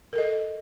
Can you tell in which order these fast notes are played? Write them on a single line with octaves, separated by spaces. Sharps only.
A#4 A4 D#5